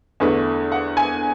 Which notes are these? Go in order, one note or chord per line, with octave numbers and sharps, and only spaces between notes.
E2 D3 A3 B4
F#5
G#5